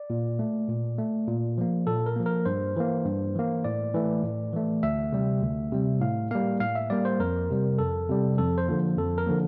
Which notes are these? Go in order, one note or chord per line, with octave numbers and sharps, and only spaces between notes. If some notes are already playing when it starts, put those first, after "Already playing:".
Already playing: D5
A#2
A3
A#2
A3
A#2
F3 A#3
A#2 A4
A#4
F3 A#3
A#4
G2 C5
E3 A#3
G2
E3 A#3
A2 D5
E3 A3
A2
E3 A3
D2 E5
C3 G3
D2
C3 G3
A2 F5
G3 A#3 F5
A2 F5
E5
G3 A#3 D5
C5
F2 A#4
C3 G3
F2 A4
C3 G3
F2 A4
C5
D3 F3 A#3
F2 A4
A#4
D3 F3 A#3